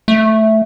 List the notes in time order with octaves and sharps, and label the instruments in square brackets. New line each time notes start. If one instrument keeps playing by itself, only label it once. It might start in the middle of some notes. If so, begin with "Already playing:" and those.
[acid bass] A3